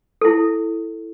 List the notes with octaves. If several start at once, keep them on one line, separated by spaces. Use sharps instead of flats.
E4 A4